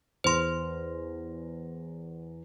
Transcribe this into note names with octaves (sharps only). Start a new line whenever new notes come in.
E2 C5 C6 A#6